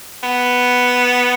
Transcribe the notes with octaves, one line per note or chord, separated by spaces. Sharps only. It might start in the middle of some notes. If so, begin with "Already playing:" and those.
B3